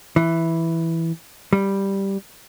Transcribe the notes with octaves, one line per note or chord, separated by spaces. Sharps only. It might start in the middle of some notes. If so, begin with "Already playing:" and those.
E3
G3